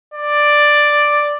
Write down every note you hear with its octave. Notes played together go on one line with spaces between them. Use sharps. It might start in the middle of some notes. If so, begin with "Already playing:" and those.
D5